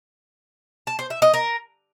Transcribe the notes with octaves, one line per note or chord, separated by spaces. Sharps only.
A5
C5
E5
D#5
A#4